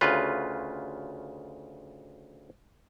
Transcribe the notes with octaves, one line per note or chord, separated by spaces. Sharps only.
D2 C#3 F4 B4